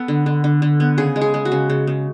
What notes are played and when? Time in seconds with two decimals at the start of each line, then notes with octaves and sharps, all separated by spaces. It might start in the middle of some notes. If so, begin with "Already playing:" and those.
Already playing: B3 A4
0.08 D3
0.26 D3
0.44 D3
0.62 D3
0.80 B3
0.98 C#3 G#4
1.16 G#3
1.21 G#4
1.34 G#3
1.45 F#4
1.52 C#3
1.70 C#3
1.87 C#3